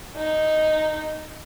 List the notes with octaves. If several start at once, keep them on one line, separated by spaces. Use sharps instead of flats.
D#4